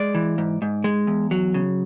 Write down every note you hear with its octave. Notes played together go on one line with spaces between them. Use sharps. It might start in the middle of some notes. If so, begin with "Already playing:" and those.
Already playing: G#3 D5
E3
G#2
G#2
G#3
E2
F#3
C#3